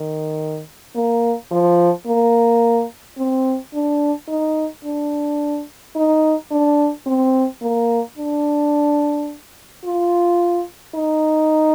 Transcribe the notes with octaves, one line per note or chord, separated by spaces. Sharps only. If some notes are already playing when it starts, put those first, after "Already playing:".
Already playing: D#3
A#3
F3
A#3
C4
D4
D#4
D4
D#4
D4
C4
A#3
D4
F4
D#4